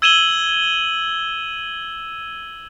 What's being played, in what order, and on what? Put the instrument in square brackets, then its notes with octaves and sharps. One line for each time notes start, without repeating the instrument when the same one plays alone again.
[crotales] E6 G#6 D#7 E7 F#7 G7